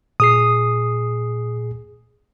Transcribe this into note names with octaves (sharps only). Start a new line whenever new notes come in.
A#2 G#4 D#6 C7